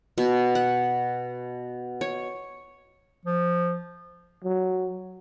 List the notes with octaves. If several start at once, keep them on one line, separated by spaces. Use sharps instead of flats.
B2
F#5
C#5
F3
F#3